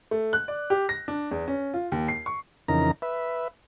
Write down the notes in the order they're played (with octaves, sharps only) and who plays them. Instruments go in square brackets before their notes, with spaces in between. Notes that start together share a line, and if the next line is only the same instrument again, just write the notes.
[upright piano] A3
F#6
D5
G4
A#6
D4
E2
C#4
F4
D#2
C7
C#6
[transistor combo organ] F2 C#3 E3 D#4 A#4 A#5
B4 E5